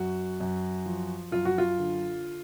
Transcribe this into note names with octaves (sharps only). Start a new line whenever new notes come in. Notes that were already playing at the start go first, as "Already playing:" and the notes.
Already playing: F#2 F#4
F#2
F3
F#2 F4
F#4
F4
D3